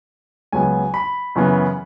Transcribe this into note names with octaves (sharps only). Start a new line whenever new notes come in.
C#2 C#3 F#3 B3 G#5
B5
F#2 C#3 E3 B3